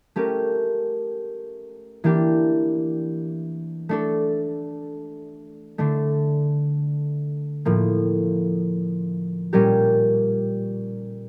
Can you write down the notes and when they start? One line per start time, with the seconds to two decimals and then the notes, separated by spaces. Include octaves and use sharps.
0.16 A3 C#4 G4 A#4
2.04 E3 A#3 D4 G4
3.89 A3 D4 A4
5.78 D3 A3 D4
7.65 A2 F3 A#3
9.53 A#2 G3 C#4 G4 A#4